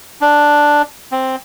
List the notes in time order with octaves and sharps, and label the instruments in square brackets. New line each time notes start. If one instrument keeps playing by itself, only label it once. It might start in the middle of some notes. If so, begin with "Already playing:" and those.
[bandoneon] D4
C4